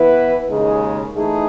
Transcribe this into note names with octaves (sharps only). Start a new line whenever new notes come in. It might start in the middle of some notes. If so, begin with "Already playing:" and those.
Already playing: E3 B3 E4 B4
D#2 C#3 G#3 D#4 G#4
E3 A3 D#4 G#4